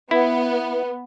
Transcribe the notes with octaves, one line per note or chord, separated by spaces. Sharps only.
B3 E4